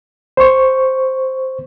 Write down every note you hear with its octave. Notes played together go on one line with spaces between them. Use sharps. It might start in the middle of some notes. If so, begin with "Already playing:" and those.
C5 C#6